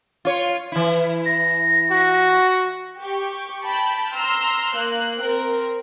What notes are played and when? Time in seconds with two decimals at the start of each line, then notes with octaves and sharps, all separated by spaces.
0.25 F4 C#5
0.72 E3 E4
1.26 A#6
1.90 F#4
3.00 G4 C#6
3.65 G5 A5 B5
4.14 A#5 C6 E6 F6
4.73 A#3 F#6
5.22 C4 A#4